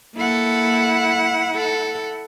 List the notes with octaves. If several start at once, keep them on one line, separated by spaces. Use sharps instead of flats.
A#3 E4 A4 F#5
A4